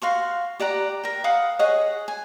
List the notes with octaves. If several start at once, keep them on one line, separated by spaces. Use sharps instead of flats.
F#4 F5 C6 C#6
G4 D5 F#5 A#5
A#4 G5
F5 F#5 B5 D#6
G#4 C#5 D#5 F#5
G#5